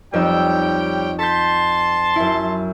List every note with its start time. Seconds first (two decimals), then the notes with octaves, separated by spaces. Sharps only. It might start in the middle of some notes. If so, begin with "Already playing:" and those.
0.14 F2 G3 D#4 C#5 G5 E6
1.20 A5 C6 G6 B6
2.16 F#2 E4